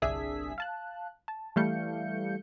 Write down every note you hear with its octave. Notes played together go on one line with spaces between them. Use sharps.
G1 C2 D4 G#4 E5 B6
F5 A5 F#6
A5
E3 G3 A3 F5 G6 C#7